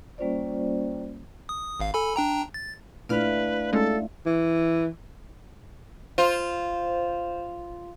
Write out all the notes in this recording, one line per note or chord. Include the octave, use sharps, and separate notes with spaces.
G3 A#3 C#4 F4 C5 D5
D#6
G#1 F5
A4 G#5 B5
D4 G5 A#5
A6
A#2 A3 D4 E4 B4 D5 F5 F6
G#3 A3 C#4 D#4 F4 A4
E3
F4 C5